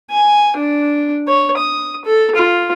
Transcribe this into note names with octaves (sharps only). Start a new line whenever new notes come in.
G#5
D4
C#5
D#6
A4
F4